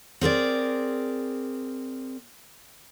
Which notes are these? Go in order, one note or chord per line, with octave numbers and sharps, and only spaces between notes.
C4 G#4 A#4 D5